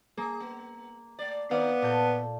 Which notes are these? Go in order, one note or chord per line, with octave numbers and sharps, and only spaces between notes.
A#3 G#4
B3
A3 D5
D#3 B3 C4 D#4 D5 F5
A#2 A4 G6